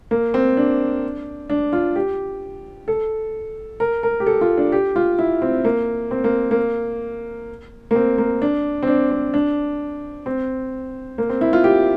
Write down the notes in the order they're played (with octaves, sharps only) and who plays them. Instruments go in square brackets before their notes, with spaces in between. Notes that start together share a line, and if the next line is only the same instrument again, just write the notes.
[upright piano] A#3
C4
D4
D4
F4
G4
A4
A#4
A#4
G4
A4
F4
D4
G4
F4
E4
C4
A#3
C4
A#3
A#3
A#3
C4
A#3
D4
C4
D4
C4
D4
C4
A#3
C4
E4
F4
G4